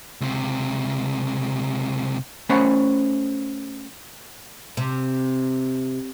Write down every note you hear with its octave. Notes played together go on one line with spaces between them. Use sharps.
C#2 C3
A3 C#4 C5 F#5 B5
C3